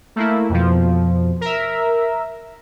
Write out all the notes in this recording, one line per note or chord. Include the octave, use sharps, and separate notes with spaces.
A3 A#3 E4
F2 B2 F3
A#4 E5